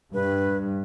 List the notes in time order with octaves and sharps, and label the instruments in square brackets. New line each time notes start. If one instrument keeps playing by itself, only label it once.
[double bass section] G2 [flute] B4